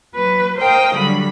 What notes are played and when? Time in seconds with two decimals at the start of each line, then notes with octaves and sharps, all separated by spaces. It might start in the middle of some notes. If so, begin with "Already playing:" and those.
0.15 F#3 B4
0.58 A#4 C5 D#5 F5 G5 D#6
0.95 D3 F#3 G3 B5